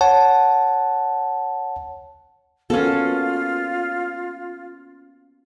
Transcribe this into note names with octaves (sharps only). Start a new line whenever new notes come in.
C#5 F#5 A5
A#3 B3 C#4 F4 F#4 A4